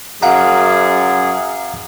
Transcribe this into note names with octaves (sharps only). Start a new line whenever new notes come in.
F#2 G#4 F5 F#5 A#5